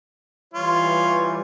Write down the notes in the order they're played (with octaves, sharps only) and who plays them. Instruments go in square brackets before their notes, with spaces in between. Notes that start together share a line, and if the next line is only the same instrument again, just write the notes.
[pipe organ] E3 G3 [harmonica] F4 C#5